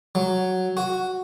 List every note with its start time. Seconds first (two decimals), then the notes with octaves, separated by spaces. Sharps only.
0.15 F#3
0.77 F#4